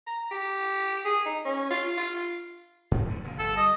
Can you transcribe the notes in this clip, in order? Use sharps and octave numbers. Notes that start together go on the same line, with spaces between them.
A#5
G4
G#4
D#4
C#4
F4
F4
G2 F#3 A3
E2 D3
F1 A#2 D3
G1 A4
G3 D#5